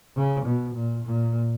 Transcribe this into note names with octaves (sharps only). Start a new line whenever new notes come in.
C#3
B2
A#2
A#2